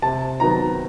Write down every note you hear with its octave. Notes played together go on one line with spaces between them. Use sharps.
C3 A5
D#3 F#3 B3 A#5